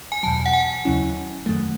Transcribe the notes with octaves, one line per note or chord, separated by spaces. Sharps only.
G#5
E2 B2 F#3 A5
F#5
G#5
D#2 C#3 F#3 C#4 E4
F#2 D#3 F#3 A3